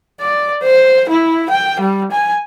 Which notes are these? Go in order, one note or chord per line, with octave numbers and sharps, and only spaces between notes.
D5
C5
E4
G5
G3
G#5